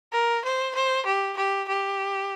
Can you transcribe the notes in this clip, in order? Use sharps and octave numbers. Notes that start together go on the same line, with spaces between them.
A#4
C5
C5
G4
G4
G4